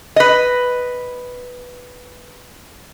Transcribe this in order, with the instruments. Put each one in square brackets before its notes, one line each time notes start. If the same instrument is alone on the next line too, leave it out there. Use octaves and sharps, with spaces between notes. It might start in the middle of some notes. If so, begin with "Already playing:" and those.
[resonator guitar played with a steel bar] B4 D#5